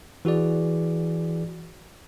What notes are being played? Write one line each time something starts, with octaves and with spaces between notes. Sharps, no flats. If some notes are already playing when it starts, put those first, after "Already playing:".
E3 F#4 G#4 D5